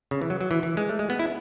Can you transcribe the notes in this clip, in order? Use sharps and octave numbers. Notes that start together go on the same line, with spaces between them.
C#3
E3
F#3
F#3
E3
E3
G#3
A3
G#3
B3
E4